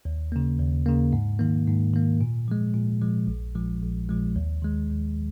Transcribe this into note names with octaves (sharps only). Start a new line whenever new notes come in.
D#2
C#3 A#3
D#2
C#3 A#3
G#2
D#3 A#3
G#2
D#3 A#3
A#2
F3 G#3
A#2
F3 G#3
A#1
A#2 F3 G#3
A#1
A#2 F3 G#3
D#2
D#3 G#3
D#2